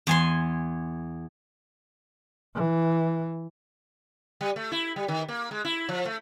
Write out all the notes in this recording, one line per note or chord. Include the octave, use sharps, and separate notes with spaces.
E2 G#5 C6
E3
G3
A3
E4
G3
D#3
A#3
G#3
E4
F3
A3